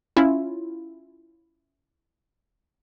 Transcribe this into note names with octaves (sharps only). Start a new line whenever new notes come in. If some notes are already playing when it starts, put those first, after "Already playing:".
C#4 E4 F4